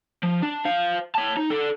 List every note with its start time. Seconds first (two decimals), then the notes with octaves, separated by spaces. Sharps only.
0.24 F3
0.43 D4
0.65 C5 F5
1.15 C#5 A5
1.37 D#4
1.50 A4 D5